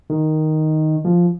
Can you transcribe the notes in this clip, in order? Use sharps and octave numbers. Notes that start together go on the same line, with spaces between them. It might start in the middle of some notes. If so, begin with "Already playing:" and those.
D#3
F3